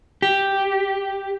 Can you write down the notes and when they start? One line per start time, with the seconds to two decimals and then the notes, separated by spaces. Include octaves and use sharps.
0.22 G4